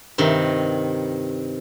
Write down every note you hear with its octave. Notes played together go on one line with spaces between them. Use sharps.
G2 C3 D#3